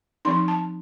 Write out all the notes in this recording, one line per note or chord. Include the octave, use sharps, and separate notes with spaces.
F3 C4 D#4 C6
A5